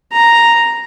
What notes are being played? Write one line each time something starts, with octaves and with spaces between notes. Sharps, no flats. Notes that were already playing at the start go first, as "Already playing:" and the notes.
A#5